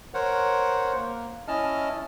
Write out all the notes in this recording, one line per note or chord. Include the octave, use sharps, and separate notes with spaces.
A#4 C5 C#5 F#5
A#3
C#4 E4 D#5 A5 F6